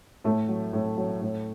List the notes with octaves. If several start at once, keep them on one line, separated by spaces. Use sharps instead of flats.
A2 A3
F#3
A2
F#3
A2